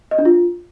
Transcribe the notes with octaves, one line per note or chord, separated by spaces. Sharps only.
D#5
D4
F4